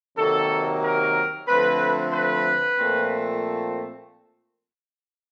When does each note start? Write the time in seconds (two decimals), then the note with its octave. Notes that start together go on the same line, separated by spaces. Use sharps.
0.17 C3 D#3 F#3 A#3 A4
0.83 A#4
1.48 D3 F3 A3 C4 B4
2.13 B4
2.79 A#2 F3 A3 C4